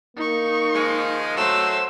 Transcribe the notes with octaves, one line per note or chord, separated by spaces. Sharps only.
A#3 D#4 C#6
D#3 F3 G#3
F#3 A3 C5 E6